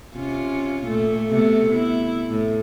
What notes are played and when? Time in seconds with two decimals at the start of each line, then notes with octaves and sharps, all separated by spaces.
0.15 C3 C#4 F4
0.85 A#2 A3
1.30 C3 A3 B3
1.71 B3 E4
2.29 A2